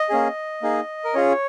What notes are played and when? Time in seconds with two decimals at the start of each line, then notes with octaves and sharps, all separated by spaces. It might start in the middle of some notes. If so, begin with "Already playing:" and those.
Already playing: D#5
0.09 A#3 C#4 G#4
0.62 A#3 D#4 G#4
1.04 A#4
1.14 C#4 F4 G#4 C#5